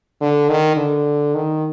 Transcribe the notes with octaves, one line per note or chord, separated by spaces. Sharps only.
D3
D#3
D3
D#3